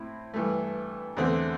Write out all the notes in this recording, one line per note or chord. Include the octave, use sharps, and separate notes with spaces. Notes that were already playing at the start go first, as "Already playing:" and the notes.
Already playing: A2 C4 E4
G2 E3 A3
E2 D3 A3 C4